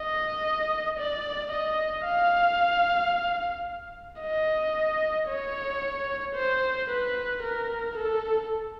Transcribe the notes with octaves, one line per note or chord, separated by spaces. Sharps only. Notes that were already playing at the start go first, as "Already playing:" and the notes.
Already playing: D#5
D5
D#5
F5
D#5
C#5
C5
B4
A#4
A4